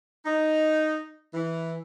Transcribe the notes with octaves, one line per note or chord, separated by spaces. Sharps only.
D#4
E3